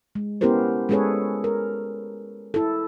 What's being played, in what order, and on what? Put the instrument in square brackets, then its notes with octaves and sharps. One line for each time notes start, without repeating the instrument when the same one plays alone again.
[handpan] G#3
B3 C#4 E4 G4 A#4 C5
G#3 C#4 G#4 A4 B4 C#5
A#4
E4 A4